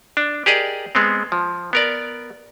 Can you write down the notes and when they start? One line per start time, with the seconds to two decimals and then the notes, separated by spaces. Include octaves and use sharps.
0.17 D4
0.46 G4 G#4 A#4 D5 D#5
0.95 G#3 B3 C4
1.32 F3
1.73 B3 A#4 D5